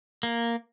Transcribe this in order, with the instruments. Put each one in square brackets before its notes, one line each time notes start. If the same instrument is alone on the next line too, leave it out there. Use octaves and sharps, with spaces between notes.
[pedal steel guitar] A#3